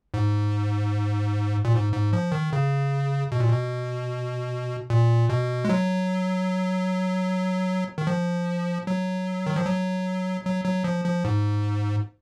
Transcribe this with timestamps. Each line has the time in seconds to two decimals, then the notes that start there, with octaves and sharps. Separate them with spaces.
0.14 G#2
1.65 A#2
1.73 G#2
1.92 G#2
2.13 F3
2.32 D#3
2.53 C#3
3.32 B2
3.40 A#2
3.48 B2
4.90 A#2
5.29 B2
5.65 G#3
5.70 F#3
7.98 D#3
8.07 F3
8.87 F#3
9.47 D#3
9.56 F3
9.66 F#3
10.45 F#3
10.65 F#3
10.84 F3
11.05 F3
11.25 G#2